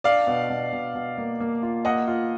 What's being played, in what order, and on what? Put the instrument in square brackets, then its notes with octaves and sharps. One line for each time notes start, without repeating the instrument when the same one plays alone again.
[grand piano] D4 [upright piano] D5 F5
[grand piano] B2
B2
B2
B2
A#3
A#3
F4
[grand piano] A#3 [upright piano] D#5 F#5
[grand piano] F4